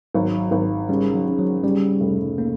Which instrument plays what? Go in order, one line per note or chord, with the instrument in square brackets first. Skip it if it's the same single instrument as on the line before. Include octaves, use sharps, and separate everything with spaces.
[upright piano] G#1 [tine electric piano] F#3
[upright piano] G#1
[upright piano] C#3 [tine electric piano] G3
[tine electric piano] F#3
[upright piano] C#3
[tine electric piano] F#3
[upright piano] C#3 [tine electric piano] G3
[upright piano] F1
[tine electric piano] A#3